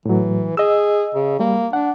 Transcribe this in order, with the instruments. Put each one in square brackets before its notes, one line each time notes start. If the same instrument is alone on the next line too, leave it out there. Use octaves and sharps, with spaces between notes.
[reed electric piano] A2 F#3 [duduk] E3
[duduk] G#4 [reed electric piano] D#5 E6
[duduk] C#3
[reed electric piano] G3 [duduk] A#3
[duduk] D4 [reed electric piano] F#5